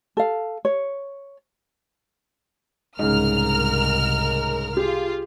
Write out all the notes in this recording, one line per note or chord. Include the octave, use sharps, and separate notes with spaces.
A4 F5
C#5
C2 G#2 C#3 A#4 F6
F4 G4 G#4